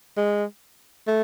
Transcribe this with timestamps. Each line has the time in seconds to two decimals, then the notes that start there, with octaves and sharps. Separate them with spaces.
0.17 G#3
1.07 A3